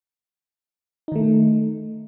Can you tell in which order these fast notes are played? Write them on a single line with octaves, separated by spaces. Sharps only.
D#4 D#3 A3